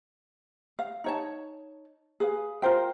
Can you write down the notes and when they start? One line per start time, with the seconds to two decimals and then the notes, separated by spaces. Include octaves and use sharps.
0.79 F5
1.04 D#4 C#5 A5
2.20 G#4 B4 F5
2.62 F4 A#4 C5 G5